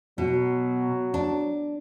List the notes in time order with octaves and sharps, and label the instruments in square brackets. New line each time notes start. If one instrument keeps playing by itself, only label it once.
[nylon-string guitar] B2 [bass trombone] F#3
[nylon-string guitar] D4